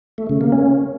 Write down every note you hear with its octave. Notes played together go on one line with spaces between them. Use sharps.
A3
C#3
A#3
C#4